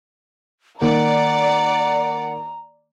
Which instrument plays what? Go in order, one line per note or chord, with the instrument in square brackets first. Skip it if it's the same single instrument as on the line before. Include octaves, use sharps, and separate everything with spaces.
[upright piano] D#3 A#3 [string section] D5 [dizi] F#5 [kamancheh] A#5